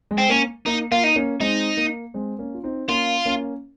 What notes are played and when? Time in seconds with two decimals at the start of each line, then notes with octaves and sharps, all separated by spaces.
0.11 G#3
0.18 C4
0.29 A#3 C#4
0.66 A#3 D#4
0.91 A#3 F4
1.04 D#4
1.16 A#3 C#4
1.40 G#3 C4 D#4
1.77 A#3
2.14 G#3 C4
2.39 A#3 C#4
2.54 F4
2.63 C4 D#4
2.88 A#3 C#4 F4
3.26 A#3 C#4